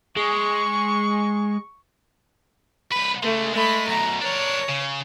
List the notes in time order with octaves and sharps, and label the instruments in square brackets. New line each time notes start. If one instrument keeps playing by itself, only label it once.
[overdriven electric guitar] G#3 [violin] C#6
[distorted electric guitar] C2 B4 [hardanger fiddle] B5
[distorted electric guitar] C#3 G#3 [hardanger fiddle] A3
[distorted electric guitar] G#3 [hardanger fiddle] A3 B5
[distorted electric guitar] F#2 B2 [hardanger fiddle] A#5
[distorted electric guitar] D4 A#4 [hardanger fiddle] C#5
[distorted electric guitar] C#3